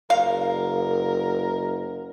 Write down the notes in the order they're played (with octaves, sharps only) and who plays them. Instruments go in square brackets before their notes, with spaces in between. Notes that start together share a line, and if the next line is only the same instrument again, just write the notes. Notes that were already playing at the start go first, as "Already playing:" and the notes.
[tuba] F#1 [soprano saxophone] A#4 [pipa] F5